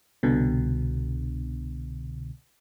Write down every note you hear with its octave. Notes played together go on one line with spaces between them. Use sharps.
C2 B2 D3